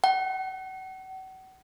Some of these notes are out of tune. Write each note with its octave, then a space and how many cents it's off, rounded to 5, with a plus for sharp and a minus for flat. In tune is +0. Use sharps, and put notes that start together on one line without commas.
F#5 +40